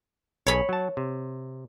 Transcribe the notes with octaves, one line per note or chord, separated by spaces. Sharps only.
B1 G#4 C#5 B5
F#3 A5
C3